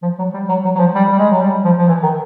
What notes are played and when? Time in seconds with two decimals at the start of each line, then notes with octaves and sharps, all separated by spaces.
0.03 F3
0.19 F#3
0.34 G3
0.49 F#3
0.65 F#3
0.75 F#3
0.80 F3
0.95 G3
1.12 G3
1.19 G#3
1.31 F#3
1.41 G3
1.64 F3
1.78 F3
1.88 E3
2.03 D#3